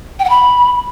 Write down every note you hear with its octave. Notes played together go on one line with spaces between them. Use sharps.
G5
F#5
B5